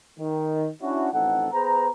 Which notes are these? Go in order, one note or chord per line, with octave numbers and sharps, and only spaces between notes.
D#3
C#4 D4 E4 F#4
A1 F2 D#4 A4 F#5
B3 G#4 B4 C5 A#5